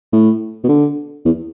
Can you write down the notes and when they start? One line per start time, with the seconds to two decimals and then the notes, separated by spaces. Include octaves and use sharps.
0.13 A2
0.64 B2
0.69 D3
1.25 E2